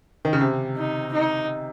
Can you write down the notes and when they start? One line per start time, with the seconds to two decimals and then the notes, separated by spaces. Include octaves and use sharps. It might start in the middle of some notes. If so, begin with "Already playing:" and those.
0.25 D#3
0.33 C#3
0.41 C3
0.76 D#4
1.13 D#4